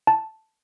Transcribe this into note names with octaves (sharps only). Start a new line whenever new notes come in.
A5